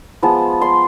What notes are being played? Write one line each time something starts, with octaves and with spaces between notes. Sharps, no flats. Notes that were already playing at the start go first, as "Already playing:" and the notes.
F3 G#3 B3 A5
C6